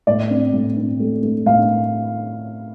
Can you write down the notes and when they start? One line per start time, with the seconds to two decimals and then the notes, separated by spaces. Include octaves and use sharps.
0.07 A2 D5
0.31 C4
0.53 A2
0.77 C4
1.00 A3
1.23 A3
1.46 A2 F5